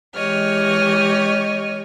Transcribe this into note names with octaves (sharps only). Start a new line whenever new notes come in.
E3 G#3 G4 C#5 D#5 F6